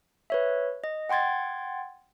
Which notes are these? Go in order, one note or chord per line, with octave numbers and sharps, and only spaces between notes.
B4 C#5 E5
D#5
F#5 G5 C6 G#6 A6